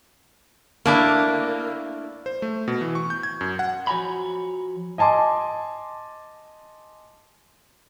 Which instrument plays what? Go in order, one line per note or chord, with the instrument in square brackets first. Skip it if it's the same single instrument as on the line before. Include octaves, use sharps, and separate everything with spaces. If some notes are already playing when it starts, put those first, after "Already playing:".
[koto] A3 D4 E4 [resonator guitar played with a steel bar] A#3
[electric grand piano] C5
A3
B2
E3
C#6
G6
G#6
F#2
F#5
[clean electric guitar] F3 F#4 C#5 G#5 A#5 B5
[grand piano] D#5 G#5 A5 C6 D6